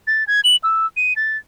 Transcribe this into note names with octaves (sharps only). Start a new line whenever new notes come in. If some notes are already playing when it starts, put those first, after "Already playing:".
A6
G#6
F#7
E6
D#7
A6